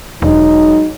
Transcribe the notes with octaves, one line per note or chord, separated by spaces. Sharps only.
E1 F#3 G#3 D#4